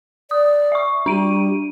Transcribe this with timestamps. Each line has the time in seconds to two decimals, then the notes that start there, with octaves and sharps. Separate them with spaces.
0.31 D5 D#6
0.72 E5 C#6
1.06 G3 D4 D7 D#7